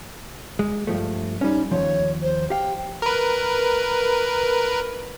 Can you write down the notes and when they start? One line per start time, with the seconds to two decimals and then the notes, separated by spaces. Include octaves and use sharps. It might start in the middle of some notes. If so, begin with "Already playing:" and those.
0.59 G#3
0.87 G2 F3 A3
1.41 G3 C#4 D#4
1.71 D#2 G#2 F3 C#5
2.22 C5
2.50 G4 F5 G5
3.02 A#4 B4